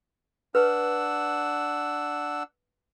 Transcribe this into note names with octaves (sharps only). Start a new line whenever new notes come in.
D4 B4 F#5 E6